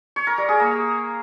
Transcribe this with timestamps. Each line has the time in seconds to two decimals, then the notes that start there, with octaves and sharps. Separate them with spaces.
0.16 C#5
0.27 A#4
0.38 G3
0.49 G#4
0.59 A#3